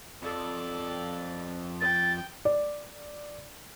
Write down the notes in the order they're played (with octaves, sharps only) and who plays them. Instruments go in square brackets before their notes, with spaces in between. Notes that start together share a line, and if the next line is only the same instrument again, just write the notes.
[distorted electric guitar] F2 [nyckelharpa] A4 D5
[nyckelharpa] G5 [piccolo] A6
[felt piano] D5